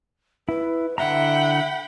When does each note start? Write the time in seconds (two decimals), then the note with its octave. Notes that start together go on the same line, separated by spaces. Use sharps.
0.49 E4 B4
0.98 D3 E4 E5 F#5 G5 A#5 B5